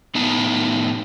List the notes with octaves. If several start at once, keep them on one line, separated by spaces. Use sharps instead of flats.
A2 B3 D#4 A5